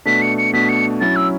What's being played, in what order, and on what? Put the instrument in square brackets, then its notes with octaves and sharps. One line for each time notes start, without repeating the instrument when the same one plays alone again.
[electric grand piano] B2 A3 D4 [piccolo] B6
[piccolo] C#7
C#7
[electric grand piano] B2 A3 D4 [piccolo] B6
[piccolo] C#7
[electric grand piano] F#3 C#4 E4 [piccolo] A6
[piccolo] E6